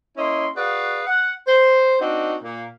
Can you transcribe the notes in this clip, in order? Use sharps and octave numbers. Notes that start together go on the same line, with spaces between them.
A#3 C#4 E4 D#5 C6
F#4 G#4 B4 D5 F5
F#5
C5
C4 D4 D#4 F#4
A#2 A#3